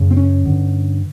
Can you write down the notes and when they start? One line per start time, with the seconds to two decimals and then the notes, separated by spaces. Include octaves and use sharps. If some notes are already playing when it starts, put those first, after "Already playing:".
Already playing: F#2 C#3
0.11 C4
0.17 C#4
0.45 G2 D3